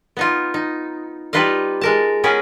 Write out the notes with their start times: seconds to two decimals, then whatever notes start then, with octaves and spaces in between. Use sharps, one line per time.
0.17 B3 D#4 F4
0.54 D#4
1.33 G3 D#4 F4 B4 D#5 F5
1.81 G#3 A#4 A5
2.24 B3 C#4 G#4 A#4 B4